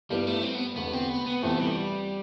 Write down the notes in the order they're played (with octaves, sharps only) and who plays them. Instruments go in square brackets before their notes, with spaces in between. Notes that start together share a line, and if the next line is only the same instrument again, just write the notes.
[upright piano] G2 F3 B3 E4 B4 [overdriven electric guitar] G3
[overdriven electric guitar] A3
C4
B3
[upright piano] F1 E2 D3 [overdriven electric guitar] B3
[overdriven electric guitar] C4
B3
B3
[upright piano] F2 C3 E3 B3 [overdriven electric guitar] A3
[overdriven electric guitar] G3